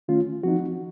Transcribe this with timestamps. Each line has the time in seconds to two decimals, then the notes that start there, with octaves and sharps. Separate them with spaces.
0.08 D#3 A3 C#4 F4
0.43 F3 C4 D#4 F#4